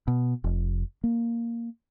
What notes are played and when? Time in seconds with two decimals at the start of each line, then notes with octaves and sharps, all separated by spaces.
0.08 B2
0.44 F1
1.04 A#3